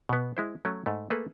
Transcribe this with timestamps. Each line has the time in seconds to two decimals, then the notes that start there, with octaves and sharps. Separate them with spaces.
0.09 B2 B3
0.37 G#3 E4 C5
0.65 F#3 A3 C#4
0.86 G#2 A3
1.10 A3 A#3 G#4 A4 B4